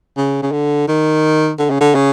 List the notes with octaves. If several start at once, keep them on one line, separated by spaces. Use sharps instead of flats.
C#3
C#3
D3
D#3
D3
C#3
D3
C#3